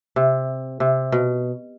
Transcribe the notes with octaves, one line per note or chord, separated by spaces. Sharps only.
C3
C3
B2